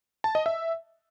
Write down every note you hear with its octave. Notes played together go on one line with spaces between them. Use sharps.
A5
D#5
E5